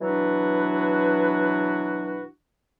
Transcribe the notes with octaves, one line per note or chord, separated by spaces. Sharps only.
B2 E3 F#3 D4 F#4 B4